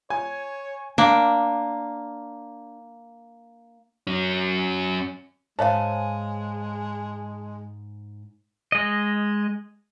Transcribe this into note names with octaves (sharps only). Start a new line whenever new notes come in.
C#5 G#5 G#6
A#3 D4
F#3 C#4
G#2 G#3 C5 C#5 F5 G#5 A5
G#3 D#5